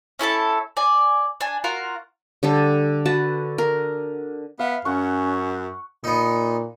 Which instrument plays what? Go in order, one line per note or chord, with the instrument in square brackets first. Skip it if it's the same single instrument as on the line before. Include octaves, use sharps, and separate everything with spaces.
[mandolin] C#4 E4 A4 A5
D5 G#5
D4 G#5
F4 F#4 A#4
[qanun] D3 G3 A4
F#4 B4 A5
A#4
[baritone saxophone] B3 [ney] E5 [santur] F5
[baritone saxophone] F#2 [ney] C#4 [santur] F#5 C#6
[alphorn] A#2 [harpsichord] B3 D#4